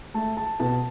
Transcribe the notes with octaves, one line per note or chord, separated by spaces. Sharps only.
A3 A5
A5
B2 A5